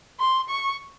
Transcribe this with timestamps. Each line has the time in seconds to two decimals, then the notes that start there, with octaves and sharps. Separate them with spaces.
0.20 C6
0.50 C#6